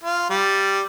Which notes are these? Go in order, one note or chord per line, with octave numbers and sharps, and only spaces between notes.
F4
G3